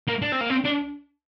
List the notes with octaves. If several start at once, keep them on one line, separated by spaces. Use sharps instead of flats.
A#3
D4
C4
A#3
C4
D4